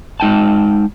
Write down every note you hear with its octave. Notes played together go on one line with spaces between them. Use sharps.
G#3 D#4 G5 A5